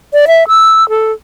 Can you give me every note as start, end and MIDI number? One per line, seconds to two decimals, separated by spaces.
0.13 0.25 74
0.28 0.47 76
0.48 0.87 88
0.89 1.12 69